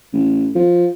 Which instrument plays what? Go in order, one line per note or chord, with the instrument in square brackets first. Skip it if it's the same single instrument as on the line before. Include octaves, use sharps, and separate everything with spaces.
[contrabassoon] A1
F3